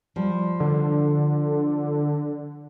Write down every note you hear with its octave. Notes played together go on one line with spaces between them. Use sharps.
F3 G3
D3